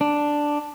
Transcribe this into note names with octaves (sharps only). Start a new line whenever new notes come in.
D4